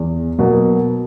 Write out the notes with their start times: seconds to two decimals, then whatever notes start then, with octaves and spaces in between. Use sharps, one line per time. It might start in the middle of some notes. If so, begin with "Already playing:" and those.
Already playing: E2
0.39 B2 F#3 A#3